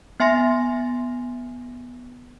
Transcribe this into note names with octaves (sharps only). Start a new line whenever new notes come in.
B3 E5 G#5 C6 A#6